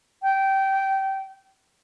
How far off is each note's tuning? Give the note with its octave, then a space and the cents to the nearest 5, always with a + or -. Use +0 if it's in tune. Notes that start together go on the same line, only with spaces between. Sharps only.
G5 -20